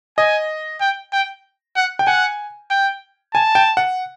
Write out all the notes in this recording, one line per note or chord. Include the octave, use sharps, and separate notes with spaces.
D#5 G#5
G5
G5
F#5
G5
F#5 G#5
G5
G#5 A5
G5
F#5